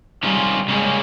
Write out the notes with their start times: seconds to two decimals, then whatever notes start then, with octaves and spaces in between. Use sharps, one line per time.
0.23 C3 D#3 G3 G#3 C#4 F4
0.68 C#3 G3 G#3 A#3 C#4 G4